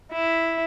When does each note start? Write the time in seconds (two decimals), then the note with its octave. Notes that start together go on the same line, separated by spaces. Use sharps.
0.12 E4